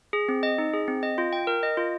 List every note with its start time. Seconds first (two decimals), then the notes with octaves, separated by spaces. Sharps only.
0.13 G#4
0.29 C4
0.43 D#5
0.58 D#4
0.74 G#4
0.88 C4
1.03 D#5
1.18 F4
1.33 G5
1.47 A#4
1.63 D#5
1.77 F4